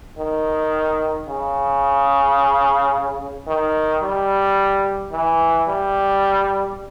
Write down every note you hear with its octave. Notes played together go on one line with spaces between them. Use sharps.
D#3
C#3
D#3
G3
E3
G3